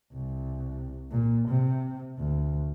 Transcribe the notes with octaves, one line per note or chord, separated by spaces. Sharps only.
C2
A#2
C3
D2